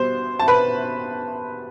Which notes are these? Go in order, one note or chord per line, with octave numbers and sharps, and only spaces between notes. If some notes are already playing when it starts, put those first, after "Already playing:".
Already playing: B2 G3 B3 C5
A5
B4 B5